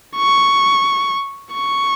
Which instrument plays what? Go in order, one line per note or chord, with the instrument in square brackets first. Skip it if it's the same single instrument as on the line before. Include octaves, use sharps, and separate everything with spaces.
[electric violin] C#6
C#6